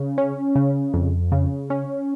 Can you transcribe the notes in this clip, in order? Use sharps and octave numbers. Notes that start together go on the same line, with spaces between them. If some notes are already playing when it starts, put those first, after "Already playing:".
Already playing: C#3
C#4
C#3
F2
C#3
C#4